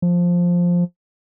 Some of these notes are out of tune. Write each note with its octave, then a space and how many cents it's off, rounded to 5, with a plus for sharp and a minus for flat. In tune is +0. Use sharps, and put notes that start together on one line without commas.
F3 +5